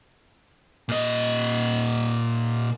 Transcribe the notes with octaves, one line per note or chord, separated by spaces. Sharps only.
A#2 D#5